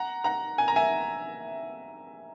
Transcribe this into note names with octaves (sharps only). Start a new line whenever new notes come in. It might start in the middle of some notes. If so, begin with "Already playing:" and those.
Already playing: F#5 A#5
F#5 A#5
G#5
A#5
E5 G#5